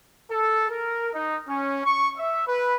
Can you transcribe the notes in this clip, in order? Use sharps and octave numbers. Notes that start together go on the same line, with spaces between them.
A4
A#4
D#4
C#4
C#6
E5
B4